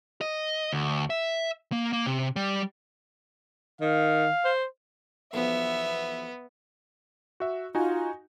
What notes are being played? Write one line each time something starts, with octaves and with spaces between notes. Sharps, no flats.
D#5
D2
E5
A#3
A#3
C3
G3
D#3 F5
C5
B1 E2 F3 B3 E5
F#4 E5
D#4 F4 F#4 G#5